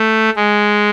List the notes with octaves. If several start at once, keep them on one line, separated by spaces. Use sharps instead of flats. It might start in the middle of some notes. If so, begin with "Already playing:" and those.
Already playing: A3
G#3